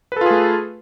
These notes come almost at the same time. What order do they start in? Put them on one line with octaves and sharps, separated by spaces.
B4 A4 F4 G#4 A3